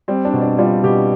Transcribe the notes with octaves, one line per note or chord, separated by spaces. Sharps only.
G3 C4
D4
B2
D4
G3 F4
B2 G4